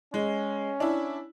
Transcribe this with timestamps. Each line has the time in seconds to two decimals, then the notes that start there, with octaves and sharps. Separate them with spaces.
0.14 G#3 C#4
0.80 D4 E4